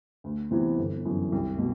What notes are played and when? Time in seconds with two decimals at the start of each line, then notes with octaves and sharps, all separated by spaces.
0.24 D2
0.51 C3 E3 B3 E4
0.77 G1
1.05 F#2 E3
1.32 C2
1.58 B2